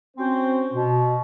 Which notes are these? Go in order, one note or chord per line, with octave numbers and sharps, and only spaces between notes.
C4 C#4 F#4 C5
B2